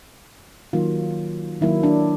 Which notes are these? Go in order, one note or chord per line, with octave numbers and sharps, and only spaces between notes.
D#3 F#3 A#3 F4
D#3 F#3 A#3 E4
D4